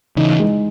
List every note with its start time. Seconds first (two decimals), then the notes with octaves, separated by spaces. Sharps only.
0.16 C#3 E3 D#4
0.39 G#3